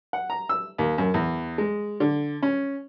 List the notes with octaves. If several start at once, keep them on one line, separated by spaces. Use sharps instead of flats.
F#5
A#5
E6
D#2
F#2
E2
G#3
D3
C#4